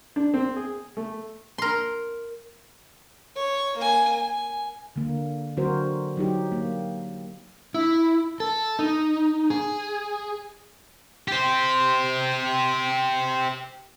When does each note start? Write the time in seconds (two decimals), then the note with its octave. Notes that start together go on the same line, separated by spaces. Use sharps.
0.16 D4
0.34 C4
0.56 G#4
0.97 A3
1.58 A#4 C6
3.36 C#5
3.77 A#3 G#5
4.13 G#5
4.96 D3 A#3
5.57 D3 F#3 C4 F#4 A#4 C5
6.17 F#3 D#4 G4
6.52 A#3
7.74 E4
8.40 A4
8.79 D#4
9.50 G#4
11.28 G4 C5